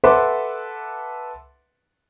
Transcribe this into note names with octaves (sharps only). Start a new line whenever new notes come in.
A4 B4 E5 F#5 C6 D6